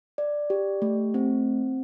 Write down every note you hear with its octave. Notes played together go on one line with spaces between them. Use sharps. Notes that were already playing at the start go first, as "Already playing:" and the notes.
D5
G4
A3
C4